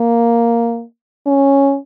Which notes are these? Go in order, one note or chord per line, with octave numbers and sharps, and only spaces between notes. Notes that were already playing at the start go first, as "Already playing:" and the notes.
Already playing: A#3
C#4